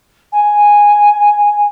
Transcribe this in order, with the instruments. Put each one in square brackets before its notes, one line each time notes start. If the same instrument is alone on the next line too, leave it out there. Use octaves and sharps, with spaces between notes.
[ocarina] G#5